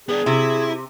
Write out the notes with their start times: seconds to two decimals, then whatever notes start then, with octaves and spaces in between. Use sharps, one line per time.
0.09 B3 D4 G#4
0.26 C3 E4